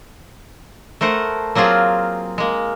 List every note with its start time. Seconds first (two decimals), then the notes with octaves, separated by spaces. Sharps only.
1.01 A3 A#4 C5 F#5
1.55 F#3 A#3 C4 F4 G#4
2.38 G#3 A#3